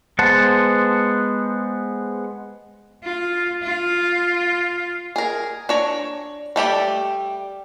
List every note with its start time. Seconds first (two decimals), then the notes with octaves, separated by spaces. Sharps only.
0.19 G#3 B3 C5 F#5 A5
3.03 F4
3.63 F4
5.16 G#4 A#4
5.69 D4 C#5 A#5
6.56 G3 A3 G4 D5